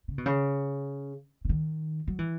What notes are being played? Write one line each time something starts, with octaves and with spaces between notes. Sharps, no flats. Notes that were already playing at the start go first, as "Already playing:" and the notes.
C#3
B2
C#3
C#3
D#3
F#3
E3